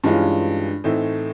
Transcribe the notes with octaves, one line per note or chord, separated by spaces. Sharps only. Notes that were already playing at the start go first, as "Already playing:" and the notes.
G2 E3 G#3 C#4 F4
A2 E3 A3 C4 D#4